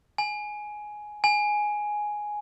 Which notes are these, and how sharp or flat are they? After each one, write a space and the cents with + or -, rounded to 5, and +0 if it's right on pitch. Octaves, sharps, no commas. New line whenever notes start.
G#5 +10
G#5 +5